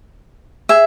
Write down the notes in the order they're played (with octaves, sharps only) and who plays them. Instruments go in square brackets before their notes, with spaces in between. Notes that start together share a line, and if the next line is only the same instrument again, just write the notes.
[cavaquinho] G#4 E5